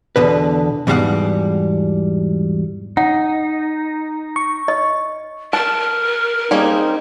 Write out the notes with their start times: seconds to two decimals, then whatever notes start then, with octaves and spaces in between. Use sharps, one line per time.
0.16 E2 B2 D3 B4
0.87 E2 G#2 B2 G3 F5 F#5
2.97 D#4 F#5
4.36 C#6
4.68 D#5
5.53 A#4 A5 F6
6.51 G3 A#3 C4 C#4 D#4 G#4